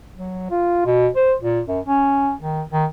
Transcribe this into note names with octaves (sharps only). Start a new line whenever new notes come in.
F#3
F4
B2
C5
A#2
F#2
C#4
D#3
D#3